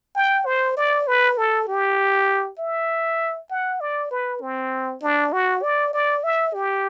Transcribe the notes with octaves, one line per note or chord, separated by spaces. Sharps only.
G5
C5
D5
B4
A4
G4
E5
F#5
D5
B4
C4
D4
F#4
D5
D5
E5
G4